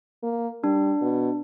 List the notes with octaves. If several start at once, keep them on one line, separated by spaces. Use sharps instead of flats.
A#3
G3 D4
B2